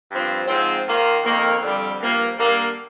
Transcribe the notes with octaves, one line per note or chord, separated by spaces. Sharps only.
G2 F3 C4
G#2 F3 C4
D#3 A#3 F4
F2 D#3 A#3
F2 D3 G3
G2 F3 A#3
D3 G3 A#3